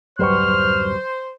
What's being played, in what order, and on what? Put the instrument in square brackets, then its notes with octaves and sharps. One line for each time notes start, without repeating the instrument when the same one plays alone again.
[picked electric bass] D1 F#2 G3 [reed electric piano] F#3 B4 C#6 [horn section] C5 [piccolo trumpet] F6